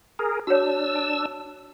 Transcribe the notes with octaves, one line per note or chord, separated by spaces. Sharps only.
G#4 A#4
D4 F#4 C#5 E6
A5